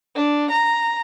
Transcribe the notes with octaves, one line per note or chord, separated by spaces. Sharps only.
D4
A#5